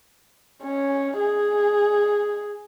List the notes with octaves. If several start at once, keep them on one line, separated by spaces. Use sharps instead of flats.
C#4
G#4